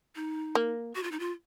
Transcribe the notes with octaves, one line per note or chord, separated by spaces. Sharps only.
D#4
A#3
F#4
F4
D#4
F4